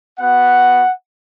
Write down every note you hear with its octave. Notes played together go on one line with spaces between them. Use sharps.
B3 F#4 F#5